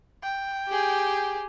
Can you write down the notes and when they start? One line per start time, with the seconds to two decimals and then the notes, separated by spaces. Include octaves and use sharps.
0.23 G5
0.68 G4 G#4